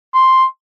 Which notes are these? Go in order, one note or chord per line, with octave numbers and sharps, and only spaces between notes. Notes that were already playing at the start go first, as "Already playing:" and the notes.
C6